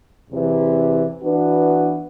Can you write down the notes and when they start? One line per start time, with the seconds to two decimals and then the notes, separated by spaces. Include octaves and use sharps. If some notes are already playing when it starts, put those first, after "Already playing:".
0.29 E2 C3 E3
1.23 E3 B3 D4 F#4 B4